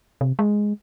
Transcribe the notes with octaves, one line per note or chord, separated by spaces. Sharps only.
C3
G#3